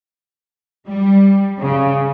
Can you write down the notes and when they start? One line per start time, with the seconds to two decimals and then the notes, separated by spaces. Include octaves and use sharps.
0.88 G3
1.61 C#3